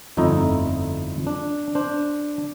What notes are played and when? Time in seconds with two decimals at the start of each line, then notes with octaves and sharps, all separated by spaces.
0.17 G1 F2 A3 D#4 E4 A#5
1.27 D4
1.75 D4 C5